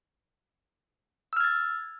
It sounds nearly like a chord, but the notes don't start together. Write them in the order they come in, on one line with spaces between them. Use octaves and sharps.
E6 F6 G#6 A6